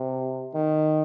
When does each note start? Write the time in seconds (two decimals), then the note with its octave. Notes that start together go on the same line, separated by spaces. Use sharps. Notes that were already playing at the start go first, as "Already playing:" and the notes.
Already playing: C3
0.54 D#3